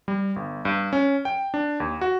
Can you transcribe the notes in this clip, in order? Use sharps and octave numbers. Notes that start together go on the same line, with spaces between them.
G3
G1
G2
C#4
G5
D4
D#2
F#4